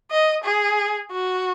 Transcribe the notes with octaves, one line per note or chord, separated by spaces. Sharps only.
D#5
G#4
F#4